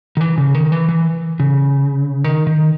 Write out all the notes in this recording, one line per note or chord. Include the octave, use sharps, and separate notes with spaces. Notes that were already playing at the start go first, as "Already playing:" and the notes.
D#3
E3
C#3
D#3
E3
E3
C#3
D#3
D#3